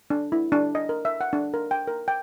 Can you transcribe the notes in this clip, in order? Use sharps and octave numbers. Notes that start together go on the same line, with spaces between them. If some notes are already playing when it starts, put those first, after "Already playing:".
D4
E4
D4
D#5
A#4
E5
F#5
D4
A#4
G5
A#4
G5